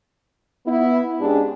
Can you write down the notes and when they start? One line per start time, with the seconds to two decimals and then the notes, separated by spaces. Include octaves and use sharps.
0.66 B3 E4
1.21 G#2 C#4 D4 G4 G#4 D5